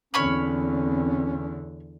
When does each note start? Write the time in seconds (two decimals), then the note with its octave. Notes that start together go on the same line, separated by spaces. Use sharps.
0.14 E2 D3 C4 C#4 C#5 B5 F6